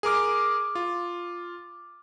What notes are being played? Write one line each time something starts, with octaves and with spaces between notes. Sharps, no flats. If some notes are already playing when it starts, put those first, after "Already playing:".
G#4 A#4 D6 F6
F4